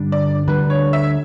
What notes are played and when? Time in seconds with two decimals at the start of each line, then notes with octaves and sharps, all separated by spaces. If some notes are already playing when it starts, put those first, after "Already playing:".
Already playing: G2 D3 G3 D4
0.12 D5
0.47 D2 D3 G3 B4
0.70 C#5
0.93 E5